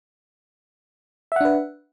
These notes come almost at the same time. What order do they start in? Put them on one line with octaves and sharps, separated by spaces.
E5 F#5 D4 B4